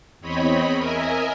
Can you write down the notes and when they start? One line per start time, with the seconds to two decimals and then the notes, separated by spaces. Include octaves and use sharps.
0.21 E2 C4 C#5 D#5 B5
0.78 A#4 D#5 E5 G#5